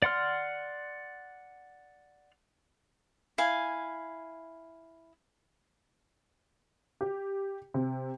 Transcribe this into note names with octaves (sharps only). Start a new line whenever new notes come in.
D5 F#5 C6 F6
E4 F5 G#5
G4
C3